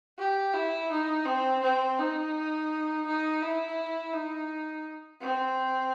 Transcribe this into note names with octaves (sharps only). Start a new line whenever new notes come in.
G4
E4
D#4
C4
C4
D#4
D#4
E4
D#4
C4